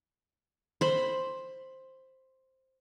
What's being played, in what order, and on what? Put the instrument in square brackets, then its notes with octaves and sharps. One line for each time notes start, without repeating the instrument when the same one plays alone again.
[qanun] C5 B5